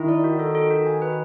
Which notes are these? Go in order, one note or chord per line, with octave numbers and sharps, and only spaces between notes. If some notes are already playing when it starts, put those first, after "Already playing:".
Already playing: D#3 E4
D5
F#4
A4
A4
F#4
G#5
B4